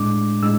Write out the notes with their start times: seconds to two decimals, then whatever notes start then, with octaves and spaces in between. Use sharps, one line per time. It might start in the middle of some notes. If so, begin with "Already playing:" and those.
Already playing: A2 G#3 D4 D6
0.42 A2 G#3 D4 E6